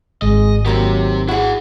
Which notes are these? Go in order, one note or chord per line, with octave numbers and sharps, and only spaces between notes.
G#1 G#3 D#5
D#3 F#3 A#3 C4 G4 A#5
E4 F#4 G#4 F#5